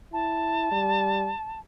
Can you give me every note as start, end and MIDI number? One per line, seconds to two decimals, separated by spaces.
0.13 0.68 64
0.13 1.58 81
0.72 1.32 55